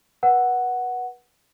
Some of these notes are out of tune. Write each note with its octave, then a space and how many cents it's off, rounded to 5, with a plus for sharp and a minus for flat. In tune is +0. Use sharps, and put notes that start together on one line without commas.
B4 -30 F#5 +0